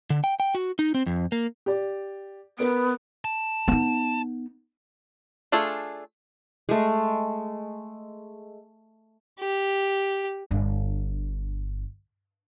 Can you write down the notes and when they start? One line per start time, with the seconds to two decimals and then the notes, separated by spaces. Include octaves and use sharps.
0.10 D3
0.24 G5
0.40 G5
0.55 F#4
0.79 D#4
0.94 C4
1.06 F2
1.32 A#3
1.66 G4 D5
2.59 B3 A#4 B4 D7
3.25 A5
3.68 B3 D#4
5.52 A3 D4 F4 G#4 A4
6.69 G#3 A3
9.40 G4
10.51 G1 D4